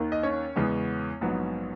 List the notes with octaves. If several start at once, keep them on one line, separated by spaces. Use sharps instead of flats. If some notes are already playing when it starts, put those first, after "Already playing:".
Already playing: D#2 D#3 A#3
D#5
C#4 C#5
E2 C#3 G#3 B3
A#1 G#2 F#3 B3